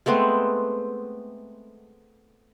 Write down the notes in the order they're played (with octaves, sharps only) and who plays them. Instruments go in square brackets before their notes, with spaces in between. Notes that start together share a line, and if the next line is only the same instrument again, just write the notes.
[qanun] G#3 A3 B3 C4